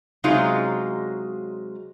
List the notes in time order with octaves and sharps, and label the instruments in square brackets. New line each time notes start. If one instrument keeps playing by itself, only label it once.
[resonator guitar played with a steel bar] C3 F#3 G#3 C#4 D#4 F4